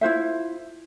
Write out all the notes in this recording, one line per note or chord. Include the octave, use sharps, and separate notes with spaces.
E4 F4 C5 E5